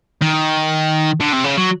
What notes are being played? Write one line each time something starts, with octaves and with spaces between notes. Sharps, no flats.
D#3
D3
C3
C#3
F#3